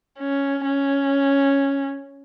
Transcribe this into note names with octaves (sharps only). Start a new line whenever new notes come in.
C#4
C#4